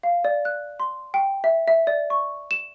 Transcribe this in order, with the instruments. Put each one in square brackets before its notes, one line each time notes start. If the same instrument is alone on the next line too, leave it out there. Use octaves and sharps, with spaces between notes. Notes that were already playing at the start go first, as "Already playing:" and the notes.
[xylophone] F5
D5
F#6
C6
G5
E5
E5
D5
C#6
E7